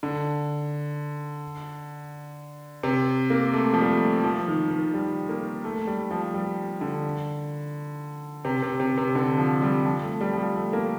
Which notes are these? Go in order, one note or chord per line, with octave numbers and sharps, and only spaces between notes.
D3
C3
A#3
A3
F3
G3
A3
F3
D#3
D#3
G3
A#3
A3
G3
F3
G3
D3
C3
C3
C3
C3
D3
F3
G3
F3
A3
G3
F3
G3
A3
A#3